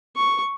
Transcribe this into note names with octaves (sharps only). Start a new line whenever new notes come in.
C#6